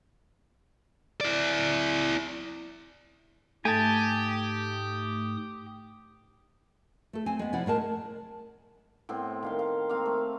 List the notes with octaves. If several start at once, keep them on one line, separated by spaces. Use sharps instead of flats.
E4 D5
G#2 A3 G4 G#5 A5 D#6
A3 A4
C4 G#5
G#3 B3
C3 F3 E4 D5 F#5
A2 G#3 A#4 A5
A2 B3 C4 C6
D#3 F5 C6
F5
A#3 C4 F5
A3